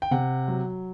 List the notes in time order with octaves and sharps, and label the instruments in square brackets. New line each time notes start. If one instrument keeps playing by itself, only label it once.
[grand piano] G5
C3 F#5
F#3